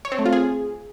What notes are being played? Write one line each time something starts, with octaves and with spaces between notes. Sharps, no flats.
C#5
C4
A3
F4
G#4